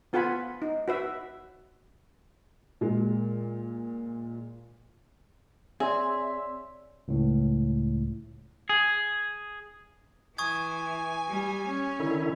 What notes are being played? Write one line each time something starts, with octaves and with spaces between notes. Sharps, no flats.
B3 F4 A4 F#5 G#5 B5
D#4
F#4 B4 E5
A#2 G#3
C4 G#4 C#5 D5 E5 C6
C#2 A2
G#4
E3 G#5 C#6 D#6 G#6
G3
C#4
D3 D#3 E4